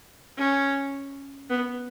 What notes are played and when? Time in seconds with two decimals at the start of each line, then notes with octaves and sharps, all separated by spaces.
0.38 C#4
1.50 B3